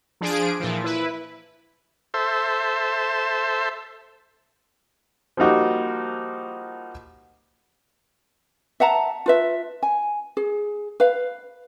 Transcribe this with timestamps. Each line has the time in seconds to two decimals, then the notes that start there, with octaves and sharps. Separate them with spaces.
0.21 F3 D4 G#4 D7
0.60 A#2 E3 F3
0.84 E4 B4
2.14 A4 C5 E5
5.37 F3 G3 A#3 D#4 F#4 G4
8.80 E5 F#5 A5 A#5
9.26 F4 B4 E5
9.83 G#5
10.37 G#4
11.00 B4 F5